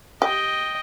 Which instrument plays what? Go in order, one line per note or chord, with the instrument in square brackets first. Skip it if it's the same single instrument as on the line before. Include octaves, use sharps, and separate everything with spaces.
[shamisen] G4 [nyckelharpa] D#5 G5